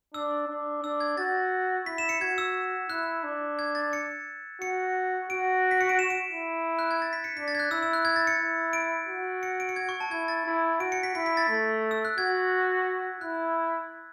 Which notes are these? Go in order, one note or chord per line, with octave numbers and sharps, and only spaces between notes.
D4 E6
D4
D4 E6
G#6
F#4 A6
E4 B6
E7
C#7
F#4 G#6
E6
E4 F#6
D4
G#6
A6
C#7
F#4 C#7
F#4 D7
B6
C#7
D7
E7
D7
E4
F#6
G#6
A6
B6
C#7
D4 B6
A6
G#6
F#6
E4 E6
E6
F#6
G#6
A6
C#7
E4
D7
F#4
C#7
D7
C#7
G#6
C#6
A5
E4 G#6
A6
E4
F#4 D7
C#7
B6
E4 B6
B6
A6
A3
E6
F#6
F#4 G#6
E4 F#6